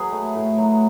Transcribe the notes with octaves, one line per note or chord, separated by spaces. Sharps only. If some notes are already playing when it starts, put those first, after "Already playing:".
Already playing: F#3 G#4 B4
A3
A2
F#3